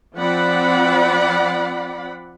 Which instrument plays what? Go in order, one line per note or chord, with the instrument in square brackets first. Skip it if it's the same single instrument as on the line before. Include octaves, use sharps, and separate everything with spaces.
[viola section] F3 C4 D5 F#5 B5